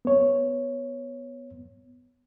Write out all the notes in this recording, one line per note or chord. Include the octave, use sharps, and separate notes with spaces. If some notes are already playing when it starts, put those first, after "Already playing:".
B3 C#5